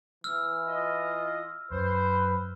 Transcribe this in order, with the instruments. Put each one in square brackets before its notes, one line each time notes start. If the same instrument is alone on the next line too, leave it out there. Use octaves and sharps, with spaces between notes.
[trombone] E3 [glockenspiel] E6 F6
[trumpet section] F4 D#5
[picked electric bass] F#2 [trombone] B4 [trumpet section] C5